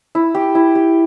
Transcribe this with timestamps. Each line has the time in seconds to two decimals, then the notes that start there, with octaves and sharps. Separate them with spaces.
0.15 E4
0.35 G4
0.55 E4
0.75 G4